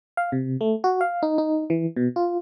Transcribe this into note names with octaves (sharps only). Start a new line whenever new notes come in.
F5
C3
A3
F#4
F5
D#4
D#4
E3
B2
F4